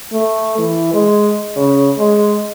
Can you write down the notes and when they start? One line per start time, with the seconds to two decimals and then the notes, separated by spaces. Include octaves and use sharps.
0.12 A3
0.58 E3
0.93 G#3
1.56 C#3
1.99 G#3